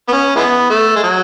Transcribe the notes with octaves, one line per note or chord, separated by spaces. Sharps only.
B3
C#4
E3 G#3 B3
A3
G#3
F#3